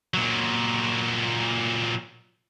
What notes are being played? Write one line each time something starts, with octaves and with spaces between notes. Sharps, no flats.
A#2 F#3